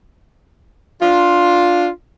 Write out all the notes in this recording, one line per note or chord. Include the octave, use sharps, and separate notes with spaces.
D4 F4